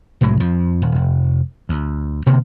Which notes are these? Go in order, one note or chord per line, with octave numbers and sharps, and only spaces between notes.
C2 A2 F#3 G#3
F2 F3
D#1
F1
D2
B2 D3 A#3 C4